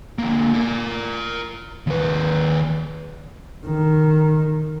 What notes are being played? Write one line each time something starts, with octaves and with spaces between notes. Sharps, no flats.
D3 A#3
A#4 D5
D#2 B4
D#3